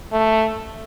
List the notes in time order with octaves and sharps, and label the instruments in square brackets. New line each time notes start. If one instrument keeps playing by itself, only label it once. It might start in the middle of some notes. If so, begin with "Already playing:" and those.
[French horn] A3